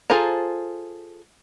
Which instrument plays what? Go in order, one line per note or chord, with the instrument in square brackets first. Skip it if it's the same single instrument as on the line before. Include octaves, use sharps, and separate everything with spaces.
[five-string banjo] F4 G#4 A4 C5 A#5